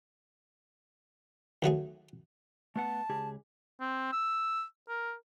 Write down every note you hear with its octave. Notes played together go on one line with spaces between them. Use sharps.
D#2 F#3 A3 G#4
A3 B3 F#5 A5
C#2 G4 G#4
C4
E6
A#4